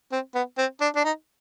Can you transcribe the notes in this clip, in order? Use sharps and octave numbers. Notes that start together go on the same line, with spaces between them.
C4
B3
C4
D4
D4
D#4